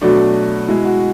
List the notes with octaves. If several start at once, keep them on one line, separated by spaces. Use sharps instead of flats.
B2 F#3 A3 D4
B2 G#3 E4
F#4